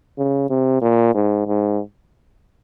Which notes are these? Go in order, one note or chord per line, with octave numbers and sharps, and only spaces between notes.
C#3
C3
A#2
G#2
G#2